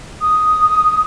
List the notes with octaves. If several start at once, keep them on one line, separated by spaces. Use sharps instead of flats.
D#6